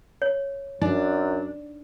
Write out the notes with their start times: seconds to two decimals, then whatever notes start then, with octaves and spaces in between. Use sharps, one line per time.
0.22 C#5
0.82 F#2 D4 D#4